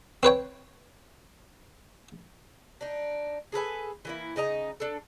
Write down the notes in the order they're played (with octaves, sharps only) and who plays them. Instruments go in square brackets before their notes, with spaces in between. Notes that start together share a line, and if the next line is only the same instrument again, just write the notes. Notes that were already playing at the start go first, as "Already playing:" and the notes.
[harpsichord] C4 B4 C#5 G5
[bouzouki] D4 D#4
G#4 A4 B4 G#5
E3 A#3 E4
C#3 D#4 D#5 A#5
D4 A4